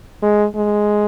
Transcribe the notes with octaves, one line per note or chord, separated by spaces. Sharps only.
G#3
G#3